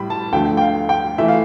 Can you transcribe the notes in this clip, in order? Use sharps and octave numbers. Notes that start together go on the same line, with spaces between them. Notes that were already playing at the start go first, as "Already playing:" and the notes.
Already playing: A2 G3 B5
A5
D2 D3 F3 A3 G5
G5
F5
G5
E3 A3 E5
F5